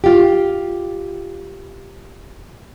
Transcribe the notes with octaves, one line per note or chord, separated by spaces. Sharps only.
F4 G4